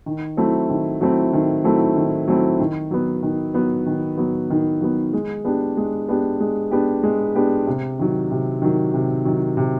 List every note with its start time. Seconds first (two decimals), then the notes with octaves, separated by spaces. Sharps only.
0.06 D#3
0.37 F#3 A3 C4 E4
0.69 D#3
1.01 F#3 A3 C4 E4
1.33 D#3
1.64 F#3 A3 C4 E4
1.96 D#3
2.28 F#3 A3 C4 E4
2.60 D#3
2.91 F#3 B3
3.23 D#3
3.54 F#3 B3
3.86 D#3
4.18 F#3 B3
4.50 D#3
4.81 F#3 B3
5.13 G#3
5.45 B3 D4 G4
5.77 G#3
6.09 B3 D4 G4
6.40 G#3
6.71 B3 D4 G4
7.03 G#3
7.35 B3 D4 G4
7.67 C3
7.99 D#3 F#3
8.31 C3
8.62 D#3 F#3
8.94 C3
9.25 D#3 F#3
9.57 C3